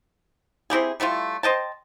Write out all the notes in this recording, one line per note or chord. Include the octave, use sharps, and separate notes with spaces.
C4 E4 G4 G#4
G3 A3 E4 F4
C5 D#5 G5 A5